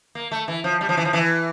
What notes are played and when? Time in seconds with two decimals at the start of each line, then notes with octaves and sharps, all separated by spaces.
0.15 A#3
0.31 A3
0.48 E3
0.64 F3
0.81 G3
0.89 F3
0.97 E3
1.05 F3
1.13 E3